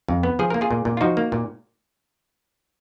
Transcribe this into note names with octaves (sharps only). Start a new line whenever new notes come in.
F2
B3
F3 G#4
A#3 A#4
F4 G#4
A#2
A#2
F4
F3 D#4 F#4
A#3
A#2